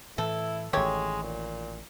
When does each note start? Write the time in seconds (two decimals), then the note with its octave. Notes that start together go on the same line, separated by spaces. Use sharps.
0.18 A2 E3 E4 A4
0.73 A1 D#3 G#3 A3 G4 C#5
1.23 A#2